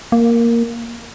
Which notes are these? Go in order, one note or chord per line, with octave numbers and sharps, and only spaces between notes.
A#3